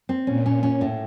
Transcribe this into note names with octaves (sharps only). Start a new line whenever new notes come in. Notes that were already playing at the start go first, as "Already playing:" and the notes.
C4
A#2 C#4
C#4
C#4
A2